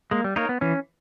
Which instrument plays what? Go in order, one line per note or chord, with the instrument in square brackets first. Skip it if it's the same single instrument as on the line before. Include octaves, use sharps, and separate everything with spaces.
[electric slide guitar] G#3 [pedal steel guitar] A#3
[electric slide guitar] G3
[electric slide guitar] A#3 [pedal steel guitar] D#4 A#4 C#5
[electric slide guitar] B3
[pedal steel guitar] E3 [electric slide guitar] C#4